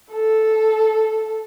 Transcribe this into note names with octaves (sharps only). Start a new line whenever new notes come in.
A4